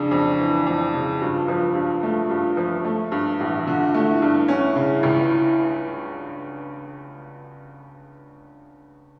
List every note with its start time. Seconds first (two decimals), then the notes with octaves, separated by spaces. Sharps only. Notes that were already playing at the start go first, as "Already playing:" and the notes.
Already playing: F2 C#3 D4
0.11 F2
0.39 E3
0.67 F2
0.93 C#3
1.21 G2 F4
1.48 F3
1.75 G2
2.03 A3
2.30 G2
2.57 F3
2.85 A3
3.12 G2
3.40 A1
3.66 D3 F4
3.94 A3
4.07 E4
4.22 G2
4.48 C#4 E4
4.75 C#3
5.03 C#2